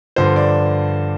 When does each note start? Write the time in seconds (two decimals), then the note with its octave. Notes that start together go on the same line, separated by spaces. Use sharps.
0.16 G2 D3 F3 C5
0.36 D5